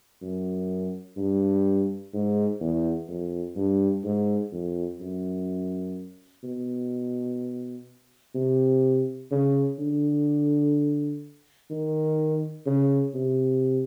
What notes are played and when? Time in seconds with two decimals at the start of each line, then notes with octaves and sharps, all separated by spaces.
0.22 F#2
1.17 G2
2.14 G#2
2.61 E2
3.09 F2
3.56 G2
4.04 G#2
4.52 F2
5.01 F#2
6.44 B2
8.35 C3
9.31 C#3
9.79 D3
11.70 D#3
12.66 C#3
13.15 C3